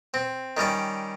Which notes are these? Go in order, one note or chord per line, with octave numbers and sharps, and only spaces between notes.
C4
D#3 G3 C#4 D5